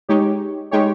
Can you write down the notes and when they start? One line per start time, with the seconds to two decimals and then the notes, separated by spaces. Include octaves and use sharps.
0.09 G#3 D#4 G4 C#5
0.71 G#3 D#4 G4 C#5